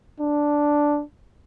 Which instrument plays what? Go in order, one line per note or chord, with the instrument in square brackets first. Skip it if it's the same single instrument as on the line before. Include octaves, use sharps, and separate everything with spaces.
[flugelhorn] D4